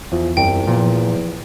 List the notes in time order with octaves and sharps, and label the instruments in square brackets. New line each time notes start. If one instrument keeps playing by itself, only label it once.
[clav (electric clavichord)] E2 [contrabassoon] F3
[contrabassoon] C2 [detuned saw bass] F#2 [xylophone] G5
[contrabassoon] E2 [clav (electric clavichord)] A#2 [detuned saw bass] F3